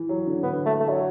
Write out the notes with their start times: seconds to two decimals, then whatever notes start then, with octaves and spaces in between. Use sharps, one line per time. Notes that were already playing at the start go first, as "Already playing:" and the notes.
Already playing: E3
0.09 F#3
0.27 D3
0.43 D3 B3
0.66 A3
0.80 A3
0.90 F#3